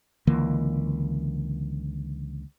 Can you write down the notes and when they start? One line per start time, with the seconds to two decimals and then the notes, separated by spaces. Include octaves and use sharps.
0.27 C#2 D3 E3 A#3